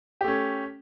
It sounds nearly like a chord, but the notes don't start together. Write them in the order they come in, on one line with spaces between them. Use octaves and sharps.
G4 A3 C#4